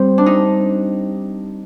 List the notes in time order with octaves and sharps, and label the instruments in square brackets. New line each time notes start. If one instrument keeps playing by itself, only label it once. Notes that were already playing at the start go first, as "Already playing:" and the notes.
Already playing: [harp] G3 C4
D4
D#4